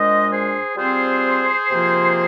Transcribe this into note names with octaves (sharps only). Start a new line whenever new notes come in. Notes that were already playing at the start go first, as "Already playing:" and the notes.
Already playing: A#2 G#3 D4 C5 D#5
G#4 C5
G3 C4 F4 G#4 C5
C3 F3 A#3 F4